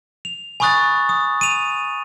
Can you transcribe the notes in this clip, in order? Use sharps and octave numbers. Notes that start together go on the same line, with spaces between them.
F7
G#5 B5 C#6 D#6 F#6 A6
D#6
D#7 F7